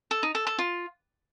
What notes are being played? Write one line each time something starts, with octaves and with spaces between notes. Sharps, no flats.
A4
D#4
A4
A4
F4